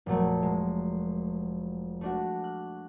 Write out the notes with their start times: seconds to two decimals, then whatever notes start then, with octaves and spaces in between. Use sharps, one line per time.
0.06 F1 A#2 F#3 A3
0.43 G#3
2.01 A3 D4 F#4
2.44 F#6